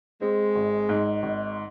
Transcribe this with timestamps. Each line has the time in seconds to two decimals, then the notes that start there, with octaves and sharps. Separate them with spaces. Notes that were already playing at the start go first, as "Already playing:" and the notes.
0.21 G#3 C4
0.56 G#1
0.89 G#2
1.23 G#1